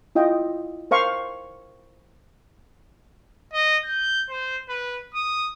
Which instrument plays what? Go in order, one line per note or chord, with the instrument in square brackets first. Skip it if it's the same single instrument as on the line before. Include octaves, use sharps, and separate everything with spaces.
[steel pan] E4 F4 D#5 G5
A#4 C5 F5 C#6
[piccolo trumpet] D#5
G6
C5
B4
D#6